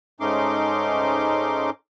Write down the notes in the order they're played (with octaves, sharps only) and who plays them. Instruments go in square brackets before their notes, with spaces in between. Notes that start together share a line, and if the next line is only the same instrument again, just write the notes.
[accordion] G#2 A3 C#4 D#4 C6 D6